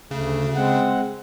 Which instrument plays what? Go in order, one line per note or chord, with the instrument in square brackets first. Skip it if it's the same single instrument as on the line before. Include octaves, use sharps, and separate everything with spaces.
[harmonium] D2 A3 [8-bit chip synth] C#3
[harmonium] G#3 C4 F#5